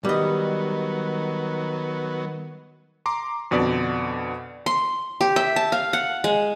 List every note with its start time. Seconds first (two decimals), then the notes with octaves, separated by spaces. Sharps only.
0.05 D#3 F#3 G3 B3 D#5
3.06 A#5 C6 D6
3.51 F2 B2 D3 D5 B6
4.66 C6
5.21 G4
5.36 E5
5.56 A5
5.72 F5
5.93 F#5
6.24 G#3